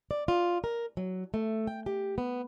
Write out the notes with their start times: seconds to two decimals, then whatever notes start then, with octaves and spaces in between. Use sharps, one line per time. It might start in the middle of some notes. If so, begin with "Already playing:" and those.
0.11 D5
0.28 F4
0.64 A#4
0.97 F#3
1.34 A3
1.67 G5
1.86 G4
2.18 B3